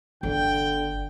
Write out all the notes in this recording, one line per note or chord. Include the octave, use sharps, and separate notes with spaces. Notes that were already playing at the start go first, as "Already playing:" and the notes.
G1 D3 G5